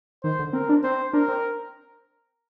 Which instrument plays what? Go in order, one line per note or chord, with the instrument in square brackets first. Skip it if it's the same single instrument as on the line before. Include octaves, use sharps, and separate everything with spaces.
[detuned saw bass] D#3 [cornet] C5
[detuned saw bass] D3
[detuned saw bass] C4 [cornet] A#4
[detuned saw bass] D4
[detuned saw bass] C4 [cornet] C5
[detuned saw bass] D4 [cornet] A#4
[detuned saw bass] C4